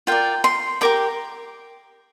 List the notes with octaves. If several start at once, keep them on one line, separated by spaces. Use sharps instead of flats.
F4 A#4 D5 G5
C6
G4 A#4 D5 D6